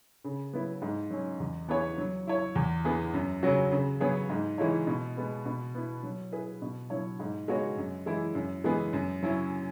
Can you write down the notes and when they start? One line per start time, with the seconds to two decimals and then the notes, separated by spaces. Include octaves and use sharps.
0.24 C#3
0.53 F#3 B3 E4 B4
0.82 G#2
1.10 F#3 C#4
1.40 E2
1.68 E3 B3 G#4 C#5
1.98 F#3
2.27 E4 C#5
2.55 E2
2.85 E3 B3 G#4
3.14 F#2
3.43 C#3 F#3 C#4 F#4
3.71 C#3
4.00 F#3 B3 G#4 C#5
4.29 G#2
4.58 E3 G#3 E4 C#5
4.87 B2
5.17 G#3 B3
5.45 B2
5.75 B3 E4
6.03 F#3
6.32 E4 G#4 B4
6.62 B2
6.90 F#3 E4 C#5
7.20 G#2
7.48 G#3 B3 F#4 C#5
7.77 F#2
8.06 E3 G#3 E4
8.35 F#2
8.64 E3 G#3 B3 G#4
8.93 F#2
9.23 F#3 C#4 E4